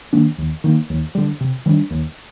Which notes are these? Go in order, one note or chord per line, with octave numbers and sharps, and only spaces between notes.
D#3 A#3 D4
D#2
D#3 A#3
D#2
D3 G3
C3
D#3 G3 D4
D#2